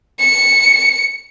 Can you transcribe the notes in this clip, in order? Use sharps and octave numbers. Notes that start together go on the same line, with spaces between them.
C#7